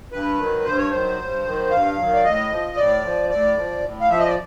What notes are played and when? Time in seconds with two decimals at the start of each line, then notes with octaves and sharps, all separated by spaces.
0.12 G2 B4
0.38 D#3 F#3
0.64 G2 C5
0.77 C#5
0.91 D#3 F#3 C5
1.18 G2
1.45 D#3 F#3
1.70 G2 F5
1.98 D#3 F#3
2.13 D5
2.24 A2 D#5
2.50 F3
2.76 A2 D5
3.04 F3
3.29 A2 D5
3.57 F3
3.82 A2
4.00 F5
4.09 F3 E5
4.19 D#5
4.27 D5